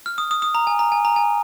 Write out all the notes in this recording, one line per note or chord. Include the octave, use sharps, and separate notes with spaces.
F6
D#6
D#6
D#6
A#5
G#5
A#5
G#5
A#5
G#5